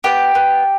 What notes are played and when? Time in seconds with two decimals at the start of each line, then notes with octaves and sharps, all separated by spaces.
0.04 B3 G4 G5
0.35 B3